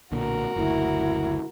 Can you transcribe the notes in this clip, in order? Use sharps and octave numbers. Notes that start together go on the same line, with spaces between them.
B1 A#2 D3 F#4 A#4
F#1 D2 E4